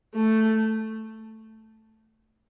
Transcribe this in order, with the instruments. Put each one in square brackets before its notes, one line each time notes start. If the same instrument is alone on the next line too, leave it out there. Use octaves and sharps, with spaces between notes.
[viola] A3